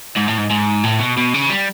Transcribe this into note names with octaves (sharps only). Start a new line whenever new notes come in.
G#2
A2
G#2
G#2
A2
B2
B2
C#3
G3